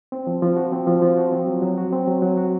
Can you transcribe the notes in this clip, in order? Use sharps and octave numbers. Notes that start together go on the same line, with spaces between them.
C4
F3
F3
F#4
C4
F3
F3
F#4
C4
F#3
F#3
F#4
C4
F#3
F#3
F#4